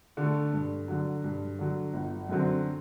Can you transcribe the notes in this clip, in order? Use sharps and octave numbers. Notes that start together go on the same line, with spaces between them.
D3 A3
G2
D3 F#3
G2
D3 F#3
G1
F#2 D3 F#3 C4